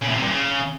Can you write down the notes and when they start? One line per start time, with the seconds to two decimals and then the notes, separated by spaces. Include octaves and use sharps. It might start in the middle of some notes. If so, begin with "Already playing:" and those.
0.02 C#3
0.09 A2
0.16 C3
0.22 G2
0.29 C#3